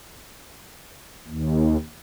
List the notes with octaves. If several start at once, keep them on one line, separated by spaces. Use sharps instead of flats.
D#2